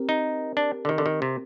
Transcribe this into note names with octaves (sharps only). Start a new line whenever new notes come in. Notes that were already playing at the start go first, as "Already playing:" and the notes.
Already playing: C4 G4 A#4
D#4
D4
D3
D#3
D3
D#3
C3